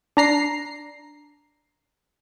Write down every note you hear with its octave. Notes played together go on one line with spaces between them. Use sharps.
D4 A#5 C7